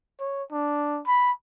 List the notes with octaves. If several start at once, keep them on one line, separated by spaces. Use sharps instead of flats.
C#5
D4
B5